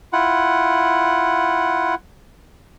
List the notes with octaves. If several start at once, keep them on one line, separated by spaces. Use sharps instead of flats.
E4 F4 F#5